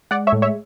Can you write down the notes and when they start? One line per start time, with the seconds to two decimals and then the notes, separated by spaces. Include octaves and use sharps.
0.11 G#3 D5 F#5
0.27 C#5 E5
0.32 A2
0.42 C#5 E5